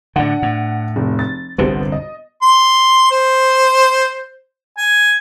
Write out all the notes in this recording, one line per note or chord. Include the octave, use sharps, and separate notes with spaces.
A2 D3 D4 F#5
A2
F1
A6
G1 C2 D3 B3 G4 C5
D#5
C6
C5
G#5